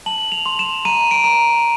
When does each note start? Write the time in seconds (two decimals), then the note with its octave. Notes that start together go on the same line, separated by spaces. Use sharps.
0.06 A5 F#7
0.32 F7
0.46 C6
0.59 E7
0.85 A#5 D#7
1.11 D7
1.24 A#5